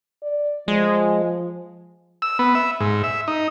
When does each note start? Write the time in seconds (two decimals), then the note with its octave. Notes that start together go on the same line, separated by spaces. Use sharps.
0.22 D5
0.68 F3 G#3
2.22 E6
2.39 B3
2.55 E5
2.80 G#2
3.04 E5
3.28 D#4